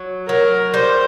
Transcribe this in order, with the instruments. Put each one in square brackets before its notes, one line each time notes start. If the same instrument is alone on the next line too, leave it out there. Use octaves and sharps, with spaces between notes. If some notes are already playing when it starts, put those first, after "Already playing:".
Already playing: [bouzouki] F#3
[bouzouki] F#3 [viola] A#4
[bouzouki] G3 [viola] C5